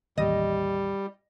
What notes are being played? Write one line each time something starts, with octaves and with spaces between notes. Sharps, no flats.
A1 D#2 G3 D#5